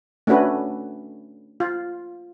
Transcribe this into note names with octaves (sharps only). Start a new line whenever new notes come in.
A3 C#4 D4 F#4 B4
F4